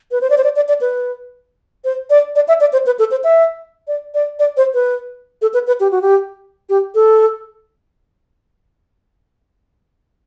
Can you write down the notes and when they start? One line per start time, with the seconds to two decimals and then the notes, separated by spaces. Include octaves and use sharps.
0.12 B4
0.21 C5
0.30 D5
0.38 C5
0.44 D5
0.56 D5
0.68 D5
0.81 B4
1.84 C5
2.10 D5
2.36 D5
2.48 E5
2.61 D5
2.73 C5
2.86 B4
2.99 A4
3.11 C5
3.24 E5
3.88 D5
4.14 D5
4.39 D5
4.57 C5
4.74 B4
5.42 A4
5.54 B4
5.67 B4
5.80 G4
5.91 F#4
6.02 G4
6.69 G4
6.95 A4